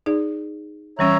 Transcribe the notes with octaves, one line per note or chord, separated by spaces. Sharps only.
D#4 G#4 D5
E3 G3 C#4 C#5 E5 A#5